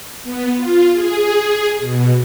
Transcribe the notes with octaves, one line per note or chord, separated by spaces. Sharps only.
B3
F4
G#4
B2